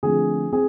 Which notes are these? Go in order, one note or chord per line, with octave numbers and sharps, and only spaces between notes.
D3 F3 A3 C4 G#4
C4 G#4